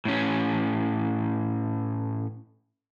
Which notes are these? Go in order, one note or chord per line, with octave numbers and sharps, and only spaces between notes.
A2 C#4